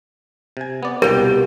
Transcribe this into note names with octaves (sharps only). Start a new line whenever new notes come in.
C3 G#5
B3 D5
C2 B2 G4 A#4 F5